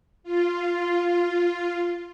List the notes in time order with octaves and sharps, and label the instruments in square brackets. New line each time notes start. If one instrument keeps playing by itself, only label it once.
[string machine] F4